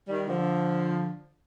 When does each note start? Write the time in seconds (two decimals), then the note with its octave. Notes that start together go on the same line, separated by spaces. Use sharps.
0.08 D#3 G3
0.27 D3 F3